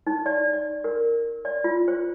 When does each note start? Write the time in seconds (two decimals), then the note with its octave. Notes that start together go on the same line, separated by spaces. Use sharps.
0.07 D#4
0.26 D5
0.53 D5
0.84 A#4
1.45 D5
1.64 F4
1.88 C5